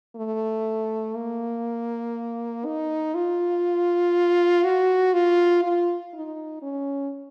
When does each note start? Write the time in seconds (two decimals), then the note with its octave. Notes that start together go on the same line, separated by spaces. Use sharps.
0.16 A3
1.16 A#3
2.65 D#4
3.15 F4
4.64 F#4
5.14 F4
5.63 F4
6.14 D#4
6.62 C#4